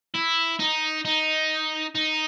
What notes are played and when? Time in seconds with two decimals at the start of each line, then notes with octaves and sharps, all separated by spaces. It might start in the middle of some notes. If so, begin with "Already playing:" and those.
0.15 E4
0.60 D#4
1.05 D#4
1.95 D#4